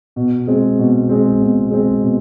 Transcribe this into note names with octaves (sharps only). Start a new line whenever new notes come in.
B2
G#3 C4
B2
G#3 C4
B2
G#3 C4
B2